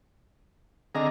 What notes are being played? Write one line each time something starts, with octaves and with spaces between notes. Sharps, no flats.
D3 C4 G#4 D#5 A#5 D6